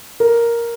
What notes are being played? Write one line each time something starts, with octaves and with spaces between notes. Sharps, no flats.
A#4